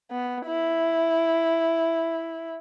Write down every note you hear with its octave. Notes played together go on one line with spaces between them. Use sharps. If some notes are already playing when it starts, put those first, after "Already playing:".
B3
E4